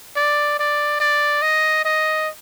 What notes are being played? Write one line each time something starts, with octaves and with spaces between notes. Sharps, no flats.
D5
D5
D5
D#5
D#5